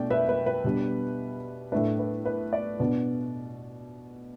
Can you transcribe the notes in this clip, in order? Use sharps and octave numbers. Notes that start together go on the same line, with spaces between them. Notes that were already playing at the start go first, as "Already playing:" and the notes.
Already playing: B2 A3 D4 D5 G5
B4 E5
B4
B4
B2 G3 D4
A2 A3 D4 B4
B4
B4
D5
B2 B3 D4